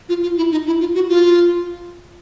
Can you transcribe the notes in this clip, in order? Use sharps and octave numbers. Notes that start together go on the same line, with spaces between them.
F4
F4
E4
D#4
E4
F4
F#4
F4